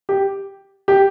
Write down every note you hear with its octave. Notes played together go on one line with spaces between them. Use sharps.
G4
G4